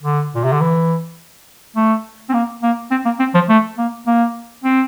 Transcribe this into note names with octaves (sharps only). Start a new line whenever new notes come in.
D3
A#2
C3
D3
E3
A3
C4
A#3
A#3
C4
A#3
C4
F3
A3
A#3
A#3
C4